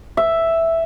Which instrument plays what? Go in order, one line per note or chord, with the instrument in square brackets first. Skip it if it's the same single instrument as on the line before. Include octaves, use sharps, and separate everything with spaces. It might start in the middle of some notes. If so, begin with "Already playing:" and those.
[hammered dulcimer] E5